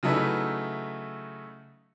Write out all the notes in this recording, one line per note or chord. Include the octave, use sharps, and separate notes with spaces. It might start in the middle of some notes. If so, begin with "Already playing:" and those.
C#3 F#3 A3 D#4 E4 B4